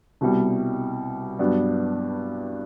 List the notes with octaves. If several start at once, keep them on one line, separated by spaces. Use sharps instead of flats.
C2 B2 G3
G2 F#3 B3 D4